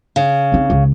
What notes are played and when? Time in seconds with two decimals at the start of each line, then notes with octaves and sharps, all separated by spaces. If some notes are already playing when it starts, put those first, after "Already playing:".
0.16 C#3
0.52 C4 D#4
0.70 C#2